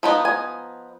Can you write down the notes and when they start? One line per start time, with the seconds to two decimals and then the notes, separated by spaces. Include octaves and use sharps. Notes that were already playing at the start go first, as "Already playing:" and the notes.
0.03 F3 B3 D#4 B5
0.25 G#5